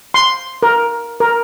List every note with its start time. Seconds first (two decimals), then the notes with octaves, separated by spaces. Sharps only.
0.14 C6
0.63 A#4
1.20 A#4